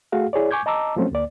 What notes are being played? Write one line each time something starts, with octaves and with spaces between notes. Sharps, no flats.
A3 F#4 G#4 F5
E4 G#4 C#5 D5
G#5 C#6 D6 G6 G#6
D#5 A5 A#5 D6 E6
F3 F#3 A3 C4 C#4
D2 A#3 D5